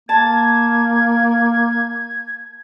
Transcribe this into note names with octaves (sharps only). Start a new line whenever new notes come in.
A#3 A5 G#6